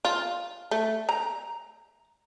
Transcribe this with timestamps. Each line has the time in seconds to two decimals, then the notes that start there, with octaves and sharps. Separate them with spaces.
0.05 F4
0.71 A3
1.09 A#5